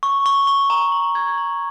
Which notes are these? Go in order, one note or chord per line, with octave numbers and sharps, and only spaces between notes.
C#6
C#6
C#6
A#5
F#7
G#6
F#7